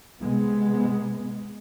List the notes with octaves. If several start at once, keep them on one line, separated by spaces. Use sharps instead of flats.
C3 G#3 B3